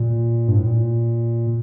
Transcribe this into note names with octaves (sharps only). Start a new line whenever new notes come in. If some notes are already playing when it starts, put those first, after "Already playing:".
Already playing: A#2
G2
A2
A#2